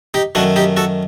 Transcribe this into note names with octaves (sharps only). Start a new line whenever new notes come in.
D#4 G4
F#2 D#3 A3 D4 F#4
D#4 G4
F#4 A4